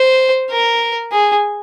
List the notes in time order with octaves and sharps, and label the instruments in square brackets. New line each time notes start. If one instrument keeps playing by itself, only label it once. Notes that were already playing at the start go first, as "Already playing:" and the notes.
Already playing: [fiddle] C5
A#4
G#4